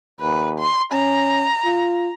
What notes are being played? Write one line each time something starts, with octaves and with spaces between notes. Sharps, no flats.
D#2 B4
C6
C#4 A#5
F4